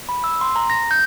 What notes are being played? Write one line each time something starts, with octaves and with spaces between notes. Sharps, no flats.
B5
E6
C6
A#5
A#6
G6